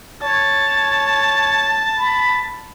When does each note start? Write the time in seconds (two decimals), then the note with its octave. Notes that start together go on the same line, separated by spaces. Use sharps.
0.23 C#5 A5
1.96 B5